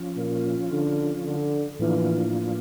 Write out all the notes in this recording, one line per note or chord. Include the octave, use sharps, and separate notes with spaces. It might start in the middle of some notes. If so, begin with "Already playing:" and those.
Already playing: F3 C#4 F4
A#2
D3
D3
A2 E3 F3 A#3 D4 F4